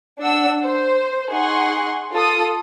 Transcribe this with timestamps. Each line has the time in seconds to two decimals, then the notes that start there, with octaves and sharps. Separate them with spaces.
0.20 D4 F#5 E6
0.62 C5
1.30 D#4 G#4 F#5 C6 C#6
2.12 F4 A4 D#6